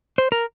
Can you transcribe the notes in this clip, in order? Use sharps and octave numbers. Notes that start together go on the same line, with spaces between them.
C5
A#4